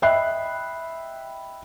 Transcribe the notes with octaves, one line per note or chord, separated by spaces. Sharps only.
D#5 E5 G5 B5 F#6 C7